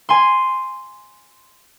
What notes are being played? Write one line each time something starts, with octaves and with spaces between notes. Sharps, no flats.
G#5 C6